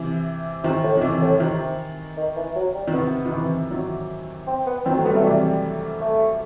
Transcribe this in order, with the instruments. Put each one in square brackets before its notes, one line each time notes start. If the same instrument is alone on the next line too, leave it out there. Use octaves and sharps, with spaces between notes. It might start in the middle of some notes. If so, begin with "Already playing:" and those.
Already playing: [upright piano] C3 E3
[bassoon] C3 [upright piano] D#3
[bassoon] A2
[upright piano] D#3
C3 E3
[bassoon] A2
[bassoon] C3 [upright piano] D#3
[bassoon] D#3
E3
F#3
G3
[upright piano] D#3
[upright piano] C3 [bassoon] B3
[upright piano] D#3
C3 E3
D#3 F#3
[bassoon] C4
B3
[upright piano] D#3 F#3 [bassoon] C4
[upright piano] A3
[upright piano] G3 [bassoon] B3
[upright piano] F#3 [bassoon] A3
[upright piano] C3 E3 [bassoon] G3
[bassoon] A3